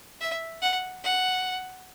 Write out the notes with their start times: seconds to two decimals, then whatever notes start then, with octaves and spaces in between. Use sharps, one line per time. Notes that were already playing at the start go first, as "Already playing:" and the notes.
0.21 E5
0.62 F#5
1.04 F#5